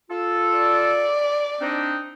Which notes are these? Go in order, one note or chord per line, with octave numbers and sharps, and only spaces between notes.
F4 A4
D5
C4 D4 D#4